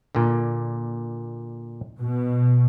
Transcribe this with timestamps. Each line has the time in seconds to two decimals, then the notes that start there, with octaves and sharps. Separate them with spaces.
0.15 A#2 D3
1.98 B2